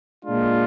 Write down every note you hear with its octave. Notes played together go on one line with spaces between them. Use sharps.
A#2 G#3 D4 F4